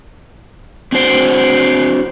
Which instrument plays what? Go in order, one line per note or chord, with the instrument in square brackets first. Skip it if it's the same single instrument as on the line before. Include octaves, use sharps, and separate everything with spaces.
[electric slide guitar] C4 D4 F#4 C5